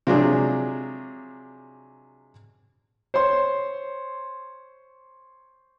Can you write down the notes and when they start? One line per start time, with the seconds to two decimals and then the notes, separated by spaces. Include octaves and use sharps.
0.07 C3 F3 F#3 G#3 D4 G#4
3.14 C5 C#5 C6